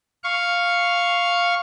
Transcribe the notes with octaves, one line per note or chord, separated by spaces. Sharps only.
F5 C#6